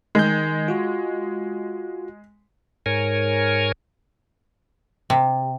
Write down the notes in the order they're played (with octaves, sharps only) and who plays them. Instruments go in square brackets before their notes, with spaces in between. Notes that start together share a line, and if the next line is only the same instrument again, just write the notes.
[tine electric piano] D#3 G6 [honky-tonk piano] G#3
[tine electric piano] F4 F#4
[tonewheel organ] G#2 A#4 C#5 G#5
[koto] C3